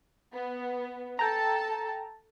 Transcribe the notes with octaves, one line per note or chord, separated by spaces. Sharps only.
B3
A4 G5 A5 A#5